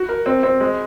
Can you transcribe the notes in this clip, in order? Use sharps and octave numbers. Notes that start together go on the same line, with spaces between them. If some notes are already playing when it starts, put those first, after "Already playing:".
Already playing: F#4
A#4
C4
C4
G#3